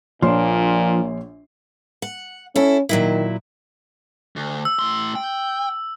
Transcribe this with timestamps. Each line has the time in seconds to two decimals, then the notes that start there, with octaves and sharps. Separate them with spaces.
0.22 A#1 A#2 F3 D4 C#5 C6
2.02 F#5
2.56 C#4 E4 A4
2.89 A#2 D#3 F#3 E4
4.36 D2
4.65 E6
4.79 A2 C6
5.15 G5